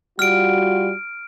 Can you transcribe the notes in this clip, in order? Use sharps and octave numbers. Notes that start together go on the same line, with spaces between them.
G3 F4 F#4 F6 D7